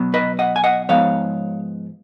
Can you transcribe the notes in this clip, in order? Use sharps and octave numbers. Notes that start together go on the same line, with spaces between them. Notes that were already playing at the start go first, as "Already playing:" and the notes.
Already playing: B2 F#3 B3
B4 D#5
D#5 F#5
G#5
D#5 F#5
G#2 F3 G#3 B3 C#5 F5